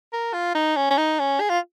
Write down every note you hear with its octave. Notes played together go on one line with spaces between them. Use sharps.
A#4
F4
D#4
C#4
C#4
D#4
C#4
G#4
F4